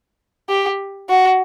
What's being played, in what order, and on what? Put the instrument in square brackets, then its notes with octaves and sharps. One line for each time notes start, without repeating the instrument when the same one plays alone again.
[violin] G4
F#4